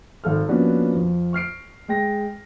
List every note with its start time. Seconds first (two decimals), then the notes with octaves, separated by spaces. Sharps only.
0.24 G#1 A4 F6
0.48 F3 A#3 B3 C#4 D4 F#4
0.95 F2
1.33 C#6 F6 C7 D7
1.88 G#3 G5 A#6